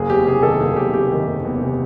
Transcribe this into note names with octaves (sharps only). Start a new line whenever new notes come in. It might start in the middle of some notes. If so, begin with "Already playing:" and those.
Already playing: F#1 G#4
E2 G4
C3 G#4
D#3 A4
F#1 G#4
E2 G4
C3 G4
D#3
F#1
E2
C3